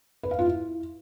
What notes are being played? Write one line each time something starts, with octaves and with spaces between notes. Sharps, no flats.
B4
F5
F4
E4